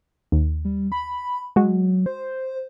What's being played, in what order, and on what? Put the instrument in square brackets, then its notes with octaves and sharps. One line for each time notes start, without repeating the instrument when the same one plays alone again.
[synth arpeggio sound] D#2
[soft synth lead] G3
B5
[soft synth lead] F#3 [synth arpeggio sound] G#3 F#4
[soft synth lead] C5